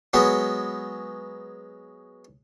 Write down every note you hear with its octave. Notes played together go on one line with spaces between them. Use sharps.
F#3 G#3 B3